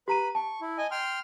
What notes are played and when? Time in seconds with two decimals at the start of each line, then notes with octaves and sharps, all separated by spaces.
0.08 G4 B4 A#5 B5 D#7
0.35 A5 C#6
0.61 E4
0.78 D#5 G#5
0.91 G5 C6 F6